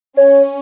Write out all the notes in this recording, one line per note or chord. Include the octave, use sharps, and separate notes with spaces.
C#4 C#5